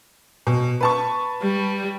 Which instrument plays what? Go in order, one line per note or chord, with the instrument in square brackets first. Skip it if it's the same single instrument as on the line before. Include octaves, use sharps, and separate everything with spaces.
[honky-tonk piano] B2
B4 A5 C#6
[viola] G3